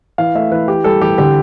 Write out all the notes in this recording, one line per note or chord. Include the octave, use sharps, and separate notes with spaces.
E3 F5
A3 E5
E3 B4
E3 G4
G3 A4
E3 G4
D3 G4